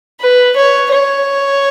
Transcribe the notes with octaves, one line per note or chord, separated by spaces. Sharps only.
B4
C#5
C#5